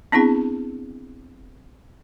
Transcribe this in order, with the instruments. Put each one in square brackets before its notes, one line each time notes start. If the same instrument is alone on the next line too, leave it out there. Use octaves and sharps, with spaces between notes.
[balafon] B3 C4 D4 E4 G#4